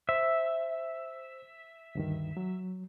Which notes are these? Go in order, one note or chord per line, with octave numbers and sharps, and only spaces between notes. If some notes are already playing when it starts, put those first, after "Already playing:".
C5 E5
D2 G2 D#3
F#3